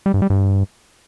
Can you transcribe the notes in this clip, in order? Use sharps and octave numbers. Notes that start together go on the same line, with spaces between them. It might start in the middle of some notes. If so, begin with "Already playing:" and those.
G3
G2
G3
G2